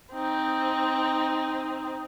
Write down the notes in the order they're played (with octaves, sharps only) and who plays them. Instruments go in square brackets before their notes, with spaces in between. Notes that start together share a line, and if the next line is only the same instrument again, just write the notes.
[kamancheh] C4 D#4